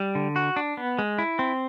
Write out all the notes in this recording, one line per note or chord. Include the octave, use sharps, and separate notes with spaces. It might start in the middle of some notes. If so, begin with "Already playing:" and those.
Already playing: G3
D3
F#4
D4
B3
G#3
E4
C4